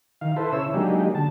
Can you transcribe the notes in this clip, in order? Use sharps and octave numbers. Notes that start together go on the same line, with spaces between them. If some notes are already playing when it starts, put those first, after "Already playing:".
D#3 F5
E4 A4 B4 C5
C#3 E4 C#5 E6
F#3 G#3 A#3 D4 D#4 G4
D3 A5